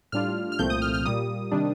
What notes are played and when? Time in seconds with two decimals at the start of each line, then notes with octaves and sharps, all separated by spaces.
0.12 A2 G3 D4 F4 F6
0.52 F6
0.59 C2 A#2 F3 A3 C4 G6
0.70 D#6
0.82 F6
0.94 F6
1.05 A#2 G3 A#3 D#6
1.51 C3 D#3 G3 D4